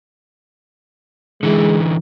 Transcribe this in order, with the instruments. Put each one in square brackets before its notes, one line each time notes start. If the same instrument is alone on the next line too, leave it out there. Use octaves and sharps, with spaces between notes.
[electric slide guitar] D3 E3 [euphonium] G#3